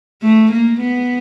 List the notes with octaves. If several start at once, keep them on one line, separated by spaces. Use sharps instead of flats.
A3
A#3
B3